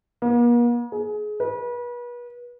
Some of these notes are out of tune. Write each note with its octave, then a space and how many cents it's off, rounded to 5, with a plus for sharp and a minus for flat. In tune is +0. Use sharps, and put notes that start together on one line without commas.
A#3 +45
G#4 +25
B4 -35